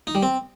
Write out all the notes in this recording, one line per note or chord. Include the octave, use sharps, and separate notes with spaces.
D#4
G3
C4